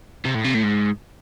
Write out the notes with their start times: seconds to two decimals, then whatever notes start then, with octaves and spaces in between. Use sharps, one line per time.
0.25 C3
0.35 A2
0.45 C3
0.55 A2
0.64 G#2